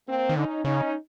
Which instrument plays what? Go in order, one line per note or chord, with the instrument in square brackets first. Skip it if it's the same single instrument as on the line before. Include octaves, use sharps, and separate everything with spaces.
[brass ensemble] A#3 C4
[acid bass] D#3
[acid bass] D3 [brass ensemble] C#4 D#4
[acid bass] C#3 [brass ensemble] C#4 D#4